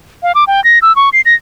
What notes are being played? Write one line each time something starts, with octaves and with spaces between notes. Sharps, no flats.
F5
D6
G5
A#6
E6
C#6
C7
A#6